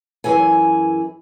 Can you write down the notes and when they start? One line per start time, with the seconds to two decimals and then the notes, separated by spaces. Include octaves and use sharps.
0.24 F#2 E3 G#4 G#5